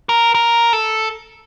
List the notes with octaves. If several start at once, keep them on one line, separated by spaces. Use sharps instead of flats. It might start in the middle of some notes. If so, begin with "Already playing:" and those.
A#4
A#4
A4